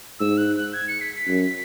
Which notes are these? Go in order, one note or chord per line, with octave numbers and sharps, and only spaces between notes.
G#2 E6
F#6
F#6
G#6
C#7
B6
B6
F#2